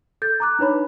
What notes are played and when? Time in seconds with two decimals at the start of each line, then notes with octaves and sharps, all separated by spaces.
0.22 A4 G6 A6
0.40 A#5 D6 F#6
0.59 D4 D#4 B4 C#5 B5